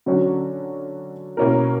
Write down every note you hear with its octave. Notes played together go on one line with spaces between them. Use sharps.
D3 F#3 C#4 F#4
B2 A#3 C#4 E4 A#4